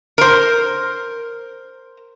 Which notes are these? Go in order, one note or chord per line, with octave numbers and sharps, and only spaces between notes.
A#4 C5